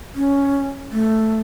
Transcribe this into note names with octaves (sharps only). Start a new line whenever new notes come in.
C#4
A3